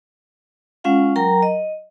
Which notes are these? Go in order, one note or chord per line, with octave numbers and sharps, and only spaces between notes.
G#3 C#4 F4 F5 F#5
F#3 A#4 G5 A#5
D#5